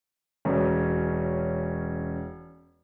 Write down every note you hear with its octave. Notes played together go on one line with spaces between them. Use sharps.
E1 C#4